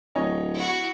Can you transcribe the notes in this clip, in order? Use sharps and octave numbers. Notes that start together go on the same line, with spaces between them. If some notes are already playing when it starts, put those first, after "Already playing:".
D1 C#5 D#5 G#5
E4 F#4